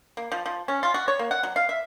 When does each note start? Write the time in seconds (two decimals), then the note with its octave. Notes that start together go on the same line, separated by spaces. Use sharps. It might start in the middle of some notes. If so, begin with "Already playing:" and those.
0.17 A#3
0.32 F3
0.46 F3
0.68 C#4
0.83 F4
0.94 F#4
1.08 C#5
1.19 A#3
1.31 F#5
1.43 F#3
1.56 F5
1.69 E5